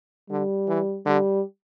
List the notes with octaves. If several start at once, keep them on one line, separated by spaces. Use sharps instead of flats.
D3 G3
E3
D3 G3